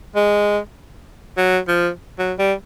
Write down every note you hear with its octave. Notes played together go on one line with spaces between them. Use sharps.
G#3
F#3
F3
F#3
G3